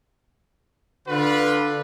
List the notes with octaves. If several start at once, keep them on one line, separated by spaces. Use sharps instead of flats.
D3 D4 F4 B4